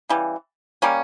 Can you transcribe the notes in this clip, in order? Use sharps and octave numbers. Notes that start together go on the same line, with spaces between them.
C#3 E3 G3
G3 A#3 C#4